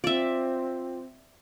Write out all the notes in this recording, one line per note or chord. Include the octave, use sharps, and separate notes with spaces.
C4 F4 D5 E5